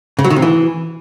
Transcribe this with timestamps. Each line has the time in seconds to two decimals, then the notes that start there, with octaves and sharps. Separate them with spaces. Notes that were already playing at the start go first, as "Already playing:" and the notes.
0.19 C#3
0.24 F#3
0.30 D#3
0.36 C3
0.42 E3